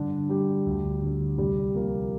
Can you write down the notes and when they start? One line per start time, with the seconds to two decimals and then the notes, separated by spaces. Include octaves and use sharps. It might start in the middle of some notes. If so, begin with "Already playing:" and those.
Already playing: G2 D3 D4
0.29 G3 G4
0.66 D2
1.02 D3 G3
1.38 C2 G3 G4
1.74 C3 F3 A#3 A#4